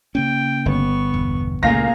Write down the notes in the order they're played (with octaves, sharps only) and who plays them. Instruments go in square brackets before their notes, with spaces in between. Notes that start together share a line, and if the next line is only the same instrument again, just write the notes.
[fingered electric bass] C#3 A#3 C#4 [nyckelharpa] G5
[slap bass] G1 [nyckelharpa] B3 C#6
[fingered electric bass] E1
[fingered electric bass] C#2 C#3 A3 [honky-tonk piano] A#2 F5 A#6 [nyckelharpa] G#4 A#5